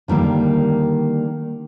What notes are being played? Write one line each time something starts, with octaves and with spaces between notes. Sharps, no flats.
D3 D#3 G3 A#3